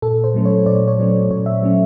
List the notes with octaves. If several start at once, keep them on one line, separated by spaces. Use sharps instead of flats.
A#2 A4
C5
F#3 A3 C#4
C#5
A#2 D5
C#5
F#3 A3 C#4
A#2 C#5
E5
F#3 A3 C#4